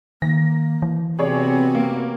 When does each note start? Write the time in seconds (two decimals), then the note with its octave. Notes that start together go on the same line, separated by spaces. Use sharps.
0.22 D#3 A#3 A#6
0.82 E3
1.19 C3 B3 C4 F#4 G#4 C#5 D5
1.75 A#3